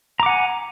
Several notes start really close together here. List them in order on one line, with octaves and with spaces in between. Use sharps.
A#5 D6 F#5 G#5